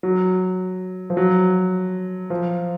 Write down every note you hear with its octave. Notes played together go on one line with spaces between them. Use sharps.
F#3
F3
F#3
F3